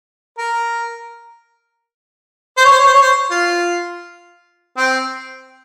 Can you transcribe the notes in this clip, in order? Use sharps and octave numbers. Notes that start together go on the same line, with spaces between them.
A#4
C5
C#5
C5
C#5
C5
C#5
C5
F4
C4